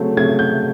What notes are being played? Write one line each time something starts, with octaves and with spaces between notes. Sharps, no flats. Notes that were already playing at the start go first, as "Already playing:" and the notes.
Already playing: C#3 F#3 A3 C4
C#3 F#3 A3 C4 G#6
G6